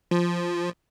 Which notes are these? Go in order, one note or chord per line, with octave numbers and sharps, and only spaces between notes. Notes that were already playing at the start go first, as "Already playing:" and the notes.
F3